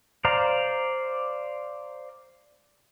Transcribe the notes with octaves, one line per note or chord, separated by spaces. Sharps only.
C5 D5 F5 A#5